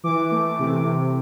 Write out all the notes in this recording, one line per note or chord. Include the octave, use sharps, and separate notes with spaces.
E3 D6
A3
C3
C3